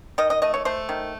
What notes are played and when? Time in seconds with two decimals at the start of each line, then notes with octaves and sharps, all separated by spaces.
0.18 D#3 D#5
0.30 D#5
0.42 A3 D#5
0.54 C#5
0.65 A3 C5
0.89 D#3